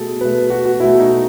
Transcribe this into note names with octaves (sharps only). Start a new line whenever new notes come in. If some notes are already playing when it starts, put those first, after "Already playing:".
Already playing: B2 A3 G#4 A4
B2 A3 B4
F#4
F#4
B2 A3 E4
D#4